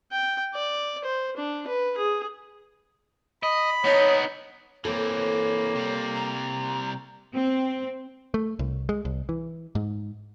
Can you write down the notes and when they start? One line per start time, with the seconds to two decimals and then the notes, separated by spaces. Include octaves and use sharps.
0.12 G5
0.54 D5
1.04 C5
1.36 D4
1.67 B4
1.97 G#4
3.43 D#5 B5
3.84 B3 D#4 C#5
4.85 E3 A#3 C4 A4 C#5
5.75 C3 G3
6.15 A#5
7.34 C4
8.34 A3
8.59 C2
8.89 G#3
9.05 C2
9.29 E3
9.75 G#2